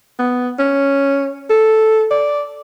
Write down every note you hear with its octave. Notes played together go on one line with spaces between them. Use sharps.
B3
C#4
A4
D5